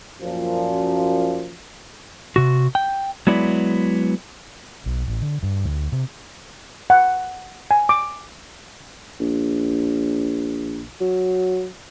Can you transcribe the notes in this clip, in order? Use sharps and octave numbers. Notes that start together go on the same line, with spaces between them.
F#2 A#2 F3
C3 F#4
G5
F#3 G#3 B3 E4 D5
B1
A1
D3
G2
D2
C3
F#5
G#5
D6
A#1
F#3